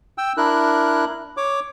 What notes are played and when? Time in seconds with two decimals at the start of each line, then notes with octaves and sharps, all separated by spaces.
0.18 G5 E6
0.37 D4 E4 A#4 F#6
1.37 C#5 D6